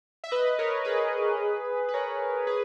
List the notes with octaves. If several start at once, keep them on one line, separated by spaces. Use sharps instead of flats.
E5
B4 D#5
A#4 C#5
G#4 B4
B4
A#4 C#5
G#4 B4